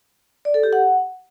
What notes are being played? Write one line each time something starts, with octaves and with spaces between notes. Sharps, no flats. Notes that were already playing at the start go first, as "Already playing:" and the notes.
D5
A4
G4
F#5